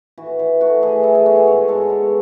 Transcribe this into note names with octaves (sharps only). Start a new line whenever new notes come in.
E3 F#4
E3
A3 F#4
E3 G#4
E3 A4
G#4
B3 F#4
G#4
G#2 C#5
G#3 A4
B3